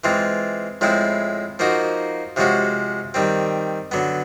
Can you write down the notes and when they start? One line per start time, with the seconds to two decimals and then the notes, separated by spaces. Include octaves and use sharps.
0.04 E3 G#3 C4 F4
0.81 A2 F3 G#3 C4 E4
1.59 F3 A#3 D#4 F#4
2.36 C3 F3 G#3 C#4 F#4
3.14 D#3 G3 C4
3.91 D3 F#3 B3